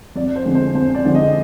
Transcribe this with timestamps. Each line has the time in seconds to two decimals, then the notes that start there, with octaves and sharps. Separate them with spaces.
0.16 F2 D5
0.36 C5
0.45 D3 F3 G#3 C4
0.55 C5
0.75 F2 C5
0.95 D5
1.05 D3 F3 G#3 C4
1.15 D#5